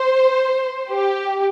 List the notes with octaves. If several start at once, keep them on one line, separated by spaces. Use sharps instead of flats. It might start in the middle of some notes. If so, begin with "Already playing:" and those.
Already playing: C5
G4